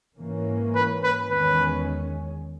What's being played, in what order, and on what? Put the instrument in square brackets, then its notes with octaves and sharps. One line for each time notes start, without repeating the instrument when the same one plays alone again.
[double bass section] G#2 E3 A#3 C#4
[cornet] B4
B4
[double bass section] E2 D#3 G#3 C#4 [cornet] B4